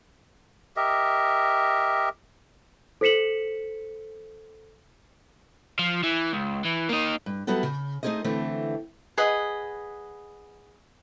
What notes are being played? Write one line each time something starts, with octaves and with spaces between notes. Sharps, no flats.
G4 A#4 D#5 E5
A4 C5 B6 C#7 E7 F#7
F3
E3
C#2
E3
A#3 D#4
G2
F#3 G3 B3 E4 F#4 A4
C#3
A3 D#4 F4 G#4 C5 D#5
D3 E3 A3 C4
G#4 B4 D#5 F#5